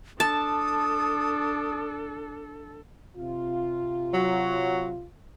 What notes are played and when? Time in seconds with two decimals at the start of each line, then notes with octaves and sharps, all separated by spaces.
0.20 D4 A4 A5 D#6
3.17 C3 F4
4.12 F#3